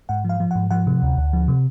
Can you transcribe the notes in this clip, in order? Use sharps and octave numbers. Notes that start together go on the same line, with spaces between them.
G#2 F#5
F3 F5
F3
G#2 F#5
F3 F#5
C3
D2
D2
F3
C3